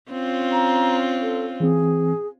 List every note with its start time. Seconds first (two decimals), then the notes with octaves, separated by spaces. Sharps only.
0.11 C4 C#4 F4
0.52 A#5
1.21 A4
1.60 E3 C4 G#4